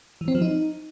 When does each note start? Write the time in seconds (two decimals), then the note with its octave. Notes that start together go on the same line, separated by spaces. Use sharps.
0.21 E3
0.28 C4
0.35 F3
0.42 D#4